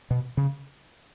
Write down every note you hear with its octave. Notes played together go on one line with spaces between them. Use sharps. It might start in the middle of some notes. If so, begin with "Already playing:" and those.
B2
C#3